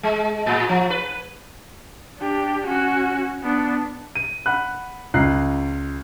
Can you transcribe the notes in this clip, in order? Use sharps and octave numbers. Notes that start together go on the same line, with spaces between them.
G#3
A2
F3
B4
D4 G4
C#4 F#4
B3 D4
D#7
F#5 B5 F#6
C#2 F4 A#5 F#6 C7